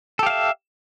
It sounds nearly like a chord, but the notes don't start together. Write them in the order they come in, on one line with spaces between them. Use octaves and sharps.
A4 G4 F5 E5